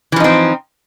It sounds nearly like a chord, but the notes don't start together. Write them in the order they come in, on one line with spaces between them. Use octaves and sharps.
E3 F3 D#4 C4